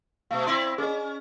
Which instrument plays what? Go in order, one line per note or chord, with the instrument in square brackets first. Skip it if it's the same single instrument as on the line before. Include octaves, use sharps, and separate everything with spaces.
[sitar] B2 A3 [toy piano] F5
[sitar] C4 E4 D5 [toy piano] C6
[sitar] C#4 [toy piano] G#4 D#5